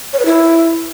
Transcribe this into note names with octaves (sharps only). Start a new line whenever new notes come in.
C#5
B4
E4